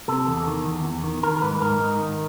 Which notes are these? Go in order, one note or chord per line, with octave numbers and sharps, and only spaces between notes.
C3 A4
E2
D#3
E2
E2
D#3
D#3 A#4
A#4
G#2 B4
G#2 A#4
D#3
D#3